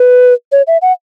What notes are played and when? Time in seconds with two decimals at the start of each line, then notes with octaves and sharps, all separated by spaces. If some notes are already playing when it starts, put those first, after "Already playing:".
Already playing: B4
0.52 C#5
0.67 E5
0.82 F#5